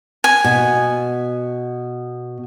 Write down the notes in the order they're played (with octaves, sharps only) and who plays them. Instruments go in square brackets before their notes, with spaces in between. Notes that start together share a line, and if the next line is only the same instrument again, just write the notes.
[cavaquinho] G#5
[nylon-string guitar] B2